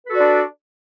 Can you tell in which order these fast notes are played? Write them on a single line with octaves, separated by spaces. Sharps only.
B4 A4 F#4 D5 D4